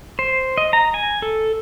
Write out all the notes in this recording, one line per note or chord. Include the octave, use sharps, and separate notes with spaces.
C5
D#5
A#5
G#5
A4